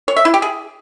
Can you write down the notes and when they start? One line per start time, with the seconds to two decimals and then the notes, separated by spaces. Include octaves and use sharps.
0.08 C#5
0.17 E5
0.25 E4
0.34 G4
0.42 G#4